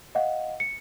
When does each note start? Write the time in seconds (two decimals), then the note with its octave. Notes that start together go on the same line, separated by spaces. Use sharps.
0.15 D#5 F5 F#5
0.60 C#7